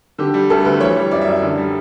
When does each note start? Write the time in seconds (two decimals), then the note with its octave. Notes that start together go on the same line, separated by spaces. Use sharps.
0.18 D3 G4
0.34 G3
0.50 D2 A4
0.65 D2 B4
0.81 E3 C#5
0.96 G3
1.11 F#2 D5
1.22 E5
1.27 F#2
1.43 D3
1.58 G3